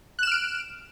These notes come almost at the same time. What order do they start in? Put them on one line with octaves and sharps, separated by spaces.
F#6 E7 F6 D7